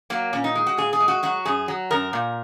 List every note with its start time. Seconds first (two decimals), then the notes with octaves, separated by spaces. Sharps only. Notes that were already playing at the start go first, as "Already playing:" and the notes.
0.10 F#3 A#3
0.33 A#2 C#4
0.44 D#4
0.55 G#3
0.67 F#4
0.77 A#2 G#4
0.93 G#4
1.00 G#3
1.08 F#4
1.23 F#3 F#4
1.45 F#2 G#4
1.68 F#3
1.91 F#2 A#4
2.13 A#2